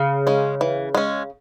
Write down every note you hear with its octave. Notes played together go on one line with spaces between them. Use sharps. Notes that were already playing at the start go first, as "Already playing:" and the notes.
Already playing: C#3
G#3 C#4
E3
G#3 C#4